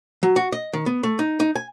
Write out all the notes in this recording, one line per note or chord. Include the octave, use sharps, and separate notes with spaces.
F#3
F#4
D#5
D#3
B3
A3
D#4
D#4
G#5